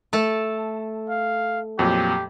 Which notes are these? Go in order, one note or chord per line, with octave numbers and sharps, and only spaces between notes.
A3 A4 A5
F5
F2 A#2 F#3 G4